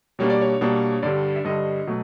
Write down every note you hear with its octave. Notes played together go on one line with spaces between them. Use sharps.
B2 G3 A#3 D4 C#5
D5
C#5
B2 G3 A#3 D4
G2 D3 G3 D5
E5
G2 D3 G3 D#5
B2 F#3 A3